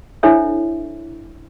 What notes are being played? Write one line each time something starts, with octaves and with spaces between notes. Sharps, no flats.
D4 E4 A4 C5 C#5 E5